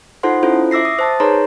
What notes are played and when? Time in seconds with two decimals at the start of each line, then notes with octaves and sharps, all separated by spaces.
0.23 D#4 F4 A4 C5 F#5 C6
0.43 C#4 E4 F4 A4 C5
0.71 E5 D6 E6 A#6 C7
0.85 D#6
0.99 C5 A5 A6
1.20 D#4 G#4 B4 C#5 A#5 C6